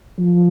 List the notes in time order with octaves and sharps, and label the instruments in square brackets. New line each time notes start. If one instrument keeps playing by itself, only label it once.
[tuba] F3